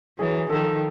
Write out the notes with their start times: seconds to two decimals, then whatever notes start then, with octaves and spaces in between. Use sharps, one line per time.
0.19 E3 F#3 G#4
0.49 D#3 F3 A4